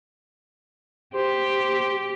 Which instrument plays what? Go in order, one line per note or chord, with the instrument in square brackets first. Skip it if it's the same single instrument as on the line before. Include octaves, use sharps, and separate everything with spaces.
[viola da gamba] G4 [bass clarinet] C5